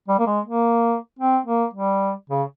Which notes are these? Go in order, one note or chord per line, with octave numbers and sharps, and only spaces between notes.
G3
A#3
G#3
A#3
C4
A#3
G3
C#3